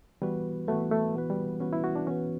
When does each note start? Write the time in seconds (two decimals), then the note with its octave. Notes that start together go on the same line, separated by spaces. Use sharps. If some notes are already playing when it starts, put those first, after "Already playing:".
0.22 E3 G3 B3 F#4 B4
0.68 E3 A3 B3 F#4 B4
0.91 A3
1.14 E3 B3 F#4 B4
1.30 G3
1.60 E3 B3 C#4 F#4 B4
1.73 E4
1.84 F#4
1.96 D4
2.07 E3 B3 C#4 F#4 B4